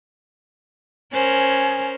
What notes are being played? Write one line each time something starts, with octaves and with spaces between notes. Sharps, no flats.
C#4 A#4 C5 G#5